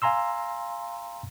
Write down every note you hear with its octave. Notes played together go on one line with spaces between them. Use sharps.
F5 G#5 A#5 C6 E6